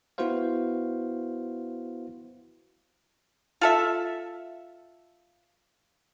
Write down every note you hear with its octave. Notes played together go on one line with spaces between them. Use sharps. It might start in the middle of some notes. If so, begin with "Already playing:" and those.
B3 E4 F#4 B4 C5 F5
F4 A4 E5